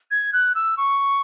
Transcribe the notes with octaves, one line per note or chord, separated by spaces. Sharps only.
G#6
F#6
E6
C#6